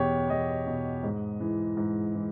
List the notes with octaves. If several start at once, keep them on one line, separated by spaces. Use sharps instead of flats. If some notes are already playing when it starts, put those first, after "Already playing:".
Already playing: E2 B2 G4 C#5
E2 D#5
B2
G#2
E3
G#2
E3